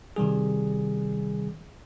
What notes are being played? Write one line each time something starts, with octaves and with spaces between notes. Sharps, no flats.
C3 D#3 G3 G#4